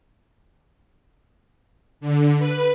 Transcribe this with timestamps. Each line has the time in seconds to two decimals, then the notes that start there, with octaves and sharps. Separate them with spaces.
2.01 D3
2.39 B4